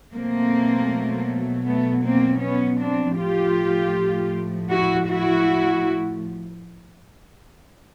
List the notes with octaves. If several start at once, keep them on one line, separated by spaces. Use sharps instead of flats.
B2 F#3 A3 A#3 C4
A3 B3
A#3 C4
B3 C#4
C4 D4
A2 F3 A3 F4 G4
E4 F#4
E4 F#4